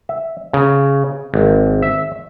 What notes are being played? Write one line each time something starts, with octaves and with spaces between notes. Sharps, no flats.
E5
C#3
G#1
E5